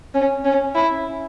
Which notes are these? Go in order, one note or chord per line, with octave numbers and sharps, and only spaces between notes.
C#4
C#4
E4